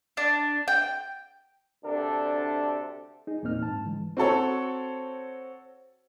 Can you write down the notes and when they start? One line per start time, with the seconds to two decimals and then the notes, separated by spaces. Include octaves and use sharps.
0.17 D4
0.68 G5
1.83 D2 C3 D4 A4
3.27 D#4 G#4
3.43 E2 A#2 A#3 C4 D#4 F6
3.63 G#2 A5
3.84 D3 E3 G#3
4.17 C4 F#4 A4 C#5